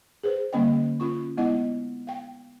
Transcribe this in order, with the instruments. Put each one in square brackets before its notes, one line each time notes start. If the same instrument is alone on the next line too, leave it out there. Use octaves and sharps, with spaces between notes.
[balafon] G#4 B4 C5
D3 G3 A#3 C#4 D#5 G5
C#4 F4 C#6
G#3 B3 E4 D#5 F#5
F5 G5